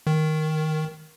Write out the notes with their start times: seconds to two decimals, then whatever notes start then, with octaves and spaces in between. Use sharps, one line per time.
0.07 D#3